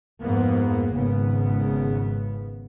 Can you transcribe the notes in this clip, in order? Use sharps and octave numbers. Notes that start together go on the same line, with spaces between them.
F2 G#2 A#3 B3
G#1 C#3 B3